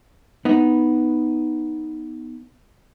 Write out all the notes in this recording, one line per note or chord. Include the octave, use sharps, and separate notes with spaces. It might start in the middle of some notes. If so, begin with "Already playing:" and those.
B3 D#4